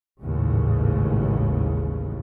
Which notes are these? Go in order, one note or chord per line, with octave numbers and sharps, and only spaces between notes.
A1 D#2 G#2 C#3